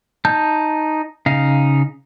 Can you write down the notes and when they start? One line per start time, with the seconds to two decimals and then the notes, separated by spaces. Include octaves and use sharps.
0.25 D#4 A5 G6
1.26 C#3 D#4 F5